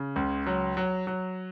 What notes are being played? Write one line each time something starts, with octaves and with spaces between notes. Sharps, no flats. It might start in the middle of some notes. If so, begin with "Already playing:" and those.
Already playing: C#3
C#2
F#3
F#3
F#3